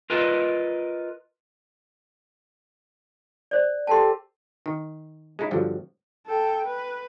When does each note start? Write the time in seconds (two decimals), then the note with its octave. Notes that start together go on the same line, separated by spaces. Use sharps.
0.10 F4 A#4 B4 D#5
3.51 C5 D5
3.87 G4 A4 G5 A5 C6
4.66 D#3
5.39 G#3 C#4 D#4 E4
5.51 G2 D3 F3 F#3
6.27 A4 G5
6.65 B4